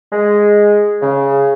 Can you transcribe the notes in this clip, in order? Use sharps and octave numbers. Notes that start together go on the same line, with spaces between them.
G#3
C#3